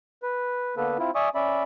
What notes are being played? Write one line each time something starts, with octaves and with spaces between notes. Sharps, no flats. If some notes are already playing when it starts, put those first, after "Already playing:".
B4
D3 A#3 B3 A4 B4
C4 E4 F4
D5 E5 G#5 C#6 D#6
C#4 D5 E5 B5